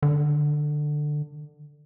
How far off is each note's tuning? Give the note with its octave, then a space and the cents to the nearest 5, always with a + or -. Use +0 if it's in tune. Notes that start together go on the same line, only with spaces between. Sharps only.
D3 +15